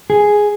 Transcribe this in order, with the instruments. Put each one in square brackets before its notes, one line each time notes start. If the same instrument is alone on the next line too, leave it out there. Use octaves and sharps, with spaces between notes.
[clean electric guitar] G#4